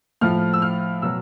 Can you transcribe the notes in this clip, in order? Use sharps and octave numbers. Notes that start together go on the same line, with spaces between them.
A2 F3 F6
E6
F6
B2 F#3 E6